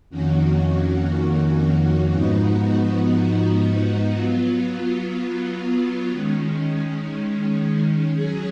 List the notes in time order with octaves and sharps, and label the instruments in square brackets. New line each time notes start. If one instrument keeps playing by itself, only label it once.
[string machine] F2 D#3 A#3 C#4 F#4
G#2 F3 B3 D#4 F#4
F#3 B3 F4
D#3 G#3 C#4
F#3 C#4 G#4